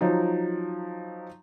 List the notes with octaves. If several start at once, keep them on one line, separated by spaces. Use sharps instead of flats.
F3 F#3 D#4